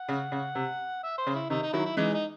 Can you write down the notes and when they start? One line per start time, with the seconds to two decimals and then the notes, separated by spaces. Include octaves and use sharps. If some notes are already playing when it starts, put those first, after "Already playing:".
Already playing: F#5
0.08 C#3
0.32 C#3
0.55 C3
1.03 E5
1.18 C5
1.27 C#3
1.35 E4
1.50 C3 D#3 D#4
1.62 D#4
1.73 D#3 F#3 E4
1.85 E4
1.97 E3 G#3 D#4
2.14 D#4